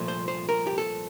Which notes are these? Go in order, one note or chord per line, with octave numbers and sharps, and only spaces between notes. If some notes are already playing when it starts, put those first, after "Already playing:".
Already playing: C2 A#2 F3 A3
C5
C5
A#4
G4
A4